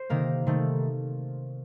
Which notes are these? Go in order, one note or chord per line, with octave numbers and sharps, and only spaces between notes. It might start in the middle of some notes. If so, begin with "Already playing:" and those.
Already playing: C5
C3 D#3 A#3 A#4
C3 D#3 A3